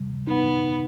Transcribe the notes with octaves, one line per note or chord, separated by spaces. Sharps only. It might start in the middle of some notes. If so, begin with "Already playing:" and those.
Already playing: C3 G3
C3
B3 D#4